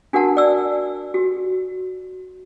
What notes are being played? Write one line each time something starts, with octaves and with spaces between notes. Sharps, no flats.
D4 F#4 A#4 F#5 A5
D5 E6
F#4